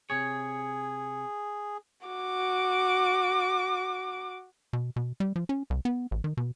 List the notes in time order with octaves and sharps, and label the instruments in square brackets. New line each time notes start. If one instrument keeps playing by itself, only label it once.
[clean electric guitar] C3 C#5 [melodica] G#4
[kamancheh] F#4 D6
[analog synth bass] B2
B2
G3
F3
C#4
C2
B3
A1
D#3
B2